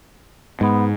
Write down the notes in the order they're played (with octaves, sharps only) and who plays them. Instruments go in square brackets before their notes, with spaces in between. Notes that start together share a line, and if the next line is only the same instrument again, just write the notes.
[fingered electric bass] G#2 [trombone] B3